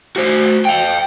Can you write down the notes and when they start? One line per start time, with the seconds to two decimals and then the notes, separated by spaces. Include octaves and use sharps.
0.16 F#4 C5
0.65 F5 G5